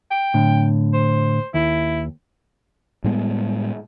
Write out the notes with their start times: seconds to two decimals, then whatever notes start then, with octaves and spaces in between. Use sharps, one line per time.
0.11 G5
0.34 A2 D3
0.94 C5
1.54 D#2 E4
3.04 A2 G3 G#3 B3